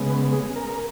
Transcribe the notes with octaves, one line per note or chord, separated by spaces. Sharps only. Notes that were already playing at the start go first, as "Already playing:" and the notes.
Already playing: C#3 G#3 B3
B4
G#4
A#4